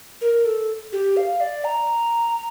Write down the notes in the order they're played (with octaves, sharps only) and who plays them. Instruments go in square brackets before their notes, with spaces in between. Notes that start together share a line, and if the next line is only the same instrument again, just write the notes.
[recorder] A#4
A4
G4
F5
D5
A#5